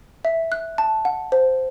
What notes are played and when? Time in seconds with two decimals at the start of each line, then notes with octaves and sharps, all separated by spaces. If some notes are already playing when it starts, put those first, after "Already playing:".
0.25 E5
0.52 F#6
0.78 A5
1.05 F#5
1.32 C5